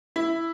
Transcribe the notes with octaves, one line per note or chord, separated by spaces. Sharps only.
E4